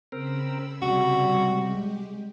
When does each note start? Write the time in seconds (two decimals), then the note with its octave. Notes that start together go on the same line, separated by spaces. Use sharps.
0.12 C#3 C4 A#4 B5 E6
0.82 C3 G3 F#4
1.45 G#3 G4